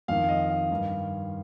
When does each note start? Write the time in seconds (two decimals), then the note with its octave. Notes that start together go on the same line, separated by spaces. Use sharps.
0.08 F2 D#3 F5
0.29 D#5
0.49 F5
0.71 G2 D#3